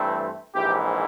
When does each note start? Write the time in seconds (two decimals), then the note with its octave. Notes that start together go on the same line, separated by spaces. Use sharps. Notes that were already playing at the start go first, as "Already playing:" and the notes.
Already playing: G2 E3 A3 C4
0.55 A#1 G#2 E3 G4